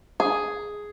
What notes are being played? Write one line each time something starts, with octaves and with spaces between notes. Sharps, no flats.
G#4